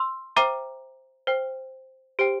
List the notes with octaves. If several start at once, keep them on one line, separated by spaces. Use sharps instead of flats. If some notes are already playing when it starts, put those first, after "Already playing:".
Already playing: C6 E6
C5 E5 G5 A#5 D6
C5 G5
G4 C5 G5